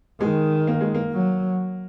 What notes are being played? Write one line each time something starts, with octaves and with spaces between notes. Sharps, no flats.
D#3 G#3
A#3
G#3
A#3
F#3